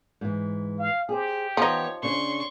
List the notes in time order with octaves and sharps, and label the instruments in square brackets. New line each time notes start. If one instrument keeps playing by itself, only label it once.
[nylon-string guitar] G#2 E3
[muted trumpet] F5
[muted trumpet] G4 [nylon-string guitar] G#4 C5
[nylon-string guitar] E3 B3 [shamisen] F3 D#4 [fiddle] C#5
[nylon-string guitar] C#3 D4 C#5 [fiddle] C6 C#6